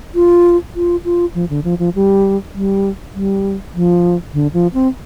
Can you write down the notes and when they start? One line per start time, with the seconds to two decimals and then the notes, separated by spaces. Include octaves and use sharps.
0.15 F4
0.75 F4
1.05 F4
1.35 F3
1.50 D3
1.64 F3
1.79 F3
1.95 G3
2.54 G3
3.14 G3
3.75 F3
4.33 D3
4.53 F3
4.74 C4